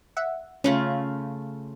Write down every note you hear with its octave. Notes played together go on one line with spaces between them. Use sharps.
E5 F#5
C#3 A3 C#4 F4